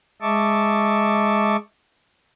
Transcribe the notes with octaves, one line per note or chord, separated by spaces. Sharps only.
G#3 D#5 E5 A5 C#6 D6